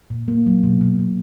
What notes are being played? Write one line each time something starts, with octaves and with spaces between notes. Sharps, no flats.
A#2
A#3
F#3
B2
B2
B2